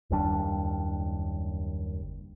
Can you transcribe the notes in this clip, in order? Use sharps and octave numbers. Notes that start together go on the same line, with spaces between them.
F#1 D#2 G3 D4